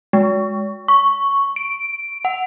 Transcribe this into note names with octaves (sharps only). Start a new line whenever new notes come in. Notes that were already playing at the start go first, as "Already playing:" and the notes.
G#3
C#6
D7
F#5